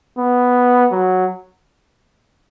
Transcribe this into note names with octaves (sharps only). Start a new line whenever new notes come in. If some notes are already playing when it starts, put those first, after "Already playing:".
B3
F#3